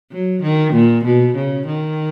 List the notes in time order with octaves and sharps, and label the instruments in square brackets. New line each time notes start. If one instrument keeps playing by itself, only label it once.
[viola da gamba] F#3
D#3
A#2
B2
C#3
D#3